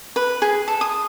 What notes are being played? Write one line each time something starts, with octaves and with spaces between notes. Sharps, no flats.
B4
G#4
A4
D#6